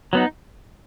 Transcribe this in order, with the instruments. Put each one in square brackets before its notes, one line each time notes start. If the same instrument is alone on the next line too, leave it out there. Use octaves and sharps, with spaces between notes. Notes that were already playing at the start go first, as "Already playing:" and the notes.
[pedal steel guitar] F#3 B3 D#4